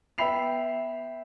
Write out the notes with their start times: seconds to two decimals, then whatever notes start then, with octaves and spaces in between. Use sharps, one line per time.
0.18 B3 E5 G5 B5 C7 F7